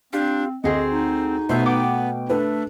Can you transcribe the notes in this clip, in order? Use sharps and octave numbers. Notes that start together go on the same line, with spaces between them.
C4 D4 F4 G4
D2 C4 F#4 G#4 D#5 C6
D#4
B2 A3 B3 C5 E5
F#5 G5 D6
A3 D4 A4 B4